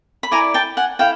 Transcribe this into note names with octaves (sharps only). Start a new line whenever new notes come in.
B5
E4 A4 D5 G#5 A#5
G5 A5
F#5 G#5
E4 A4 F5 G5